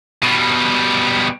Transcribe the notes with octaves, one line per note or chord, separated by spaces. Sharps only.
B2 G3